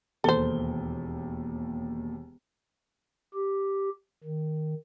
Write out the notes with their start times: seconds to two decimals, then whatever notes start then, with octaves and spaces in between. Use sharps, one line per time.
0.24 E1 D#2 A4 C5 G7
3.34 G4
4.24 D#3